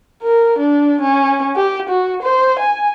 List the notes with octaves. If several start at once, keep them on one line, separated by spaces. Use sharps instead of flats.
A#4
D4
C#4
G4
F#4
C5
G#5